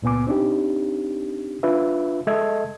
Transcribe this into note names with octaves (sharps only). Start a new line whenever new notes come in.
C#2 A#2 B3 G#5 D6
C4 D4 D#4 G4
D4 F4 B4 E5
G#3 A4 D#5 E5 G#6